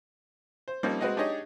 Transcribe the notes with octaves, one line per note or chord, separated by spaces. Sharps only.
C5
F3 G3 A#3 C4 C#4 D#4
G#3 B3 C4 F#4 B4 D#5
D4 D#4 G4 G#4 C#5 D#5